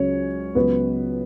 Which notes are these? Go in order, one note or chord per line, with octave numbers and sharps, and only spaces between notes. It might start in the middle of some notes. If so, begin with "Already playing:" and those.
Already playing: C#2 C#3 F#3 C#4 C#5
C#2 C#3 F#3 B3 B4